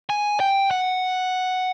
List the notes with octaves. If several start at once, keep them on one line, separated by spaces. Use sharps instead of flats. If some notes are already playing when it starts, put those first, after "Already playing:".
G#5
G5
F#5